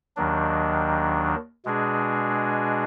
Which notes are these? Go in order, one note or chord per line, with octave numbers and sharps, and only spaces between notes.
D#2 D#3 F#3 D4
B2 G#3 D4 G#4